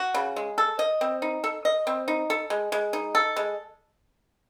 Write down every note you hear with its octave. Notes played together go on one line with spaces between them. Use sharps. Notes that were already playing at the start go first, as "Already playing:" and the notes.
Already playing: F#4
C#3
G#3
A4
D#5
C4
D#4
A4
D#5
C4
D#4
A4
G#3
G#3
D#4
A4
G#3